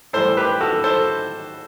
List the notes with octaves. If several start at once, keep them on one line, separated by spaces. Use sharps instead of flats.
A2 E3 G3 A4 C5
G4 B4
F#4 A4
A4 C5